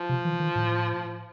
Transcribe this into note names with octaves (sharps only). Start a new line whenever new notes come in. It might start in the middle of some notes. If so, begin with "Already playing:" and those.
Already playing: F3
C3
E3
D#3
A2